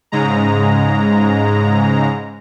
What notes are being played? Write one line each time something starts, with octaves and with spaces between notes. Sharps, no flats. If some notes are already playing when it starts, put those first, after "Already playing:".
G#2 C#3 G#3 A#5